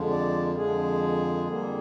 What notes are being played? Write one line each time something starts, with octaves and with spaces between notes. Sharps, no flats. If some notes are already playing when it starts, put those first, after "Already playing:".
Already playing: F2 D3 F3 G#3
D5
F2 D3 F3 G#3 G#4
F2 D3 G3 A#3